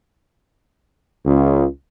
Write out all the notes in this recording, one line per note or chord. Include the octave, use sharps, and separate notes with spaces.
C#2